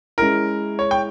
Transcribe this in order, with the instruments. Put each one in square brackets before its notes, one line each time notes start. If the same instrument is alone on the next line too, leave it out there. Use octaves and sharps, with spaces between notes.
[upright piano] G#3 C#4 E4 [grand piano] A#4
[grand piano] C#5
G5